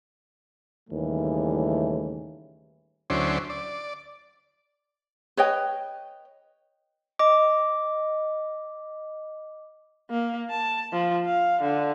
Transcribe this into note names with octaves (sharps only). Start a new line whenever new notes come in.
D#2 A2 C#3 E3 G3 A3
D2 F#3 C#4 E4 C5 D5
D5
B4 C#5 D#5 G5
D#5 D6
A#3
A5
F3
F5
D3